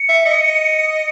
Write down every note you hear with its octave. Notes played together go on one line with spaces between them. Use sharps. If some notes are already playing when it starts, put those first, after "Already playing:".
Already playing: C#7
E5
D#5